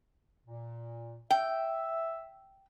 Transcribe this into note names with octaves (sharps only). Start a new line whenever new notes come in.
A#2
E5 G5